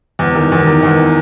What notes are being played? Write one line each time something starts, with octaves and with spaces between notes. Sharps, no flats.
E2
D#3
E2
D#3
E2